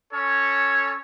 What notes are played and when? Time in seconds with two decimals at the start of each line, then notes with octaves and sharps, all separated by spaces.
0.13 C#4 A4 C#5